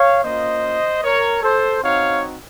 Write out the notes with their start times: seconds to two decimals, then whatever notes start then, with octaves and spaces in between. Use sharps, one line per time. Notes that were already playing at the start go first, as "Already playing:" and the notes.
Already playing: C#5 F5
0.23 A#3 C#4 F4 C5 D#5
1.04 A#4 C#5
1.43 A4 C5
1.83 C4 D#4 F#4 C#5 F5